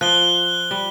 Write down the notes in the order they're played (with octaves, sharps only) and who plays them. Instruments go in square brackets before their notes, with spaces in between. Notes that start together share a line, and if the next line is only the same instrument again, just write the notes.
[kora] F3 [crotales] F#6 G7
[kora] G3